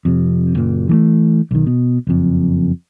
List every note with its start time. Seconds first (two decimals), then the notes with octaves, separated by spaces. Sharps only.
0.05 F2 C3
0.55 F#1 A#2
0.89 E3 G#3 A3
1.51 B1 D#3
1.66 B2
2.07 F#1 F2